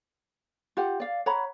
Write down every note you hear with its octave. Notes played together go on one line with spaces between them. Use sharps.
F4 G4 F#5
D5 F5
C#5 F#5 A#5 B5